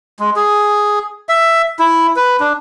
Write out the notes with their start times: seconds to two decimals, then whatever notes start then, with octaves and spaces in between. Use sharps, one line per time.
0.19 G#3
0.36 G#4
1.29 E5
1.79 E4
2.16 B4
2.40 D4